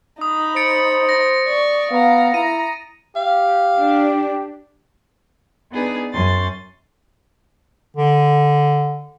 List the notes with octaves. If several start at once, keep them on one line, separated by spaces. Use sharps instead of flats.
D#4 B5 D#6
C5 A6 C#7 D7
A#6
D5 C#6
B3 F5 A#5
E4 A#5 D#7
G4 F5
D4
B3 D4 D#4 G#4 B4
F#2 C#4 C6 A6
D3